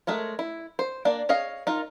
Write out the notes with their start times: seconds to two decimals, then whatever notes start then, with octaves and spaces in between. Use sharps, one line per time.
0.07 G#3 A3 A#4 C#5
0.39 E4
0.79 C5
1.05 A#3 D4 D5
1.29 G#4 C#5 D#5 F5
1.67 D#4 F4 A#4